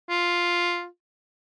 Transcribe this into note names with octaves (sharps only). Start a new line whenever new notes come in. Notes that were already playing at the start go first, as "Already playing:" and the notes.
F4